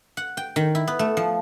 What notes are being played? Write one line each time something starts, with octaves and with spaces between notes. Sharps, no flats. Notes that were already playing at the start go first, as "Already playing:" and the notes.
F#5
G5
D#3
E4
B3
A3
F3